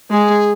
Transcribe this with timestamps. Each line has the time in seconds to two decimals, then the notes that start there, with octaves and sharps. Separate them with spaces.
0.11 G#3 G#4